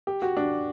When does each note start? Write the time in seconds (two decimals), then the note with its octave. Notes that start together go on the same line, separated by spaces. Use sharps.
0.07 G4
0.22 F#4
0.37 D4